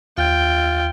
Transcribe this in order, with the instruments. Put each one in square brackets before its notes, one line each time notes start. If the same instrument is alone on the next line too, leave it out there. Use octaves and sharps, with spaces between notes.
[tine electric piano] D#2 [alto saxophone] F4 [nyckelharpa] G5